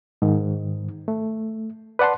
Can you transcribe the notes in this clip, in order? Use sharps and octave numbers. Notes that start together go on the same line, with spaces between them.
G#2 D#3
A3
B4 D5 F#5 A5 C6